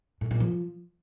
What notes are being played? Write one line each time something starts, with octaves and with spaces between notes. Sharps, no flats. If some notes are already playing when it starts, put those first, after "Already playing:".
A2
A#2
F3